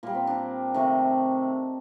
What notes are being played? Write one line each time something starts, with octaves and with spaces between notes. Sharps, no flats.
A#2 G3 A#3
C4
D4
C3 D#3 A3